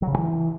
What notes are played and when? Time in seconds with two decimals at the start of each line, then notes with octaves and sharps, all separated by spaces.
0.02 F#3
0.07 C#3
0.12 G2
0.18 E3